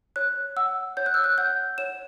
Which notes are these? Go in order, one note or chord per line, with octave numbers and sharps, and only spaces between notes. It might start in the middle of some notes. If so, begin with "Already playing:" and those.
C#5 F#6
F#5 E6
C#5 G6
F#6
E6
F#6
F#5 G6
C#5 E7